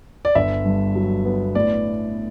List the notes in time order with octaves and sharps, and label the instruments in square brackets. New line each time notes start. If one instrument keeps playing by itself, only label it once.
[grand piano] D5
G1 E5
G2
F#3
B3
A2 D5